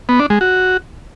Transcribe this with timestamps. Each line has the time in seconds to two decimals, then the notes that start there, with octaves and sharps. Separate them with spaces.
0.09 B3
0.20 D4
0.30 G#3
0.41 F#4